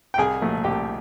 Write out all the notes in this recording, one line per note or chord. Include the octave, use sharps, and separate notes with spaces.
G5
C2 G#4 G#5
A#2 F3 A3
C2 G4 G5